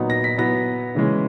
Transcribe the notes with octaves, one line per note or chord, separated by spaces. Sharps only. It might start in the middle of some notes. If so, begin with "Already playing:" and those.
Already playing: A#2 F#3 B3 D#4
A#6
B6
F#3 B3 E4 A#6
C#3 E3 G#3 C#4